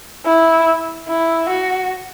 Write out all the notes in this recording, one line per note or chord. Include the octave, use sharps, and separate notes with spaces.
E4
E4
F#4